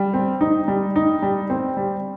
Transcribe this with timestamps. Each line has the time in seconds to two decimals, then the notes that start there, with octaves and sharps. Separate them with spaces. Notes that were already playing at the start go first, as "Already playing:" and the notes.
Already playing: G3
0.14 C4
0.41 D#4
0.68 G3
0.96 D#4
1.22 G3
1.50 C4
1.77 G3